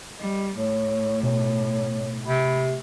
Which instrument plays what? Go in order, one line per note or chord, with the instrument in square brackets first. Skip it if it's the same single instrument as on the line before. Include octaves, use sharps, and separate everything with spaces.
[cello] G3 [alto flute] D#5
[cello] A2 [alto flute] C#5
[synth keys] B2 [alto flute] C#5
[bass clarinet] C3 [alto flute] B5